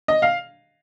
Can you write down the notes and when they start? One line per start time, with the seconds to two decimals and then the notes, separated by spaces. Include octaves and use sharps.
0.08 D#5
0.22 F5